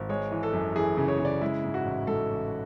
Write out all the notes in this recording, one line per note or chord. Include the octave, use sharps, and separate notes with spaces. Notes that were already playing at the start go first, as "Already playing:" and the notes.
Already playing: G#1
G#3 C#5
E3
A4
F#2
E3 G#4
C#3
C#5
C#3
D5
G#3 E4
G#2
F#4
A1
G#2 A4
A1